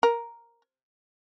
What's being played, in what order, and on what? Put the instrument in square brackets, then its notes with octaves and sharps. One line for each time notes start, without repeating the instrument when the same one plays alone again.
[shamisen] A#4